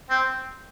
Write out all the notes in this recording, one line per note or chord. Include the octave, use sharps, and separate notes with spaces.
C4